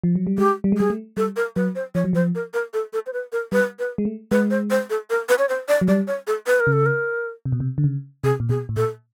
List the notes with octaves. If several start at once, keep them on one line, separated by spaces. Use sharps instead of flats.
F3
F#3
G3
G#3 G4
G3
G#3
G3 G#4
A3
G3 A4
A#4
F#3 B4
C5
F3 C#5
F#3
F3 C5
A#4
A#4
A4
A4
C5
B4
A#4
G3 B4
B4
G#3
A3
G#3 B4
C5
C5
A4
A#4
B4
C#5
C5
D5
F#3
G3 D5
C#5
A4
B4
A#4
C#3
A4
A#4
C3
B2
C3
D3
C#3
C3 G#4
A#2
B2 G#4
A2
A#2 A4